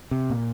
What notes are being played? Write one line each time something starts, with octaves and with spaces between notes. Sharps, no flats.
C3
A#2